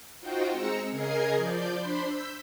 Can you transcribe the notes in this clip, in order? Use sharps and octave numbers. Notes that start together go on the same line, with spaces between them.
D#4 F4 F#4 C5 G5
G#3 C4 A#5 E6 C#7
C#3 G#4 A#4 D#5 G#6 C7
F3 D5 G6
D4 C5 B5 C6
E6 G6 B6